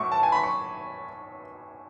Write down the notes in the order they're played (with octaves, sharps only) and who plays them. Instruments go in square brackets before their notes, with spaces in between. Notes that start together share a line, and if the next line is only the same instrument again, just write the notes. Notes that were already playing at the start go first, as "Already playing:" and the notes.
Already playing: [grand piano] A2 F#3 C#6 D6
A5
G#5
B5
C#6